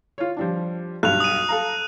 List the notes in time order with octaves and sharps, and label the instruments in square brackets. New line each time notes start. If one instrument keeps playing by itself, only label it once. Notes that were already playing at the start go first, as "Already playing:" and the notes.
[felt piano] F4 C#5
F3 G3 D4
[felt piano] B1 G2 [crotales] F#6 F7
[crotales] D#6 D#7
[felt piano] A4 F5 A#5